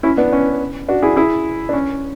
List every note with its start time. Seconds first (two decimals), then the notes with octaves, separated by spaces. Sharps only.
0.03 C#4 E4
0.17 B3 D4
0.33 C#4
0.89 D4 F#4
1.02 E4 G#4
1.16 E4 G#4
1.69 D4
1.73 C#4